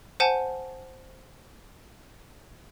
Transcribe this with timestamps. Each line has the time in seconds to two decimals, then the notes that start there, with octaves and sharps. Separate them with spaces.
0.20 C5 F#5 G#5 A5